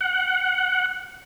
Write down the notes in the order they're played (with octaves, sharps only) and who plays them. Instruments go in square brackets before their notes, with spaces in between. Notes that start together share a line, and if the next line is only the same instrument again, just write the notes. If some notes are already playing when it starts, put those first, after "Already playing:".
[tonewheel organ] F#5